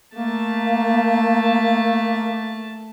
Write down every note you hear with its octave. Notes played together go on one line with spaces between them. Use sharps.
A3 A#3 A5